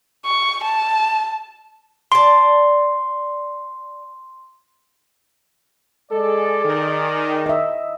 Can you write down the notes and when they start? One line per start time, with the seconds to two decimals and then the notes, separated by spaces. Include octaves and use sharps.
0.25 C#6
0.64 A5
2.12 D5 A5 C6
6.12 G#3 G#4 A4 D5
6.65 D#3
7.46 D#5 E5